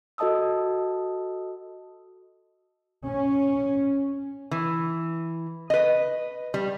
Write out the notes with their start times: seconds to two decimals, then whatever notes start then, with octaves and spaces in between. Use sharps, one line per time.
0.18 F#4 A4 D#5 A5 D#6 E6
3.05 C#4
4.51 E3
5.70 B4 D#5
6.54 G3